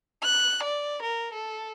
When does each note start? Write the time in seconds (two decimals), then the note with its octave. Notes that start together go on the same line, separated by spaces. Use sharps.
0.23 F#6
0.63 D5
1.02 A#4
1.34 A4